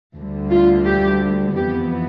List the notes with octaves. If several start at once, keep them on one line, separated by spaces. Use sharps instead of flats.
D2 D3 G3
F4
G4
F2 E3 B3 G4